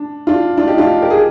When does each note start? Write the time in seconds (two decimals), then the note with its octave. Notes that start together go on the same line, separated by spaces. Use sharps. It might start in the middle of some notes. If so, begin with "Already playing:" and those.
Already playing: D4
0.27 D4 F4
0.57 D4 F4
0.67 D#4 G4
0.78 D4 F4
1.02 G4 A#4
1.10 G#4